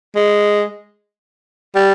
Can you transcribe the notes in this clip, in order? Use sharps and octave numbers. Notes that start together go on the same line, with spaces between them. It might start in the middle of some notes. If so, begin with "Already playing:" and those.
G#3
G3